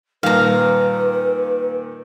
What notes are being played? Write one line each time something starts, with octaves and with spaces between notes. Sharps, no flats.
A#2 D#3 G3 B4 F5 A#5